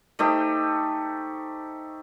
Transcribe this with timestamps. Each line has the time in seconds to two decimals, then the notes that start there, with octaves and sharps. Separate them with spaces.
0.19 A3 D#4 G4 C5